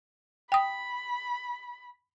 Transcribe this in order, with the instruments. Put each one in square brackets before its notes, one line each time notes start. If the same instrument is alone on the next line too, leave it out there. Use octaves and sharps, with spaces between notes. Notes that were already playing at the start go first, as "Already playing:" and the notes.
[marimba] G5 D#6 [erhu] B5